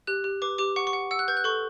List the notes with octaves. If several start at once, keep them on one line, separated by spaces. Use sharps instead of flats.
G4 F#6
G4
B4 D6
G4 D6
F#5 C#6
C#6
F#5
F#5 E6
F#6
B4 G6
F#6
A4 C#6